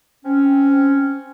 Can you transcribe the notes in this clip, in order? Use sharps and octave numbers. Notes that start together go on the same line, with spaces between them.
C4 C#4